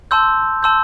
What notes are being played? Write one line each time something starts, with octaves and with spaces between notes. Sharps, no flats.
A5 C6 E6 G6
A5 C6 E6 G6